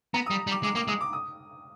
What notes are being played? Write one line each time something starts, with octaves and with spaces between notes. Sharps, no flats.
B3 A#5
G3 D#6
G3
D6
G#3 D6
A#3 D6
G#3 D#6
D6
D#6